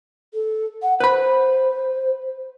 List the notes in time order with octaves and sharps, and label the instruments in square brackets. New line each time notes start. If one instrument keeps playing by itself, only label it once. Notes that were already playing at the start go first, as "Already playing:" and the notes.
[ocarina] A4
F#5
[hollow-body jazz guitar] B4 B5 [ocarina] C5